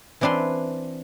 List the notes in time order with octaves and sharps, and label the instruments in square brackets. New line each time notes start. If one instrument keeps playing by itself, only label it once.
[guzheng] E3 C4 D4 B4 C6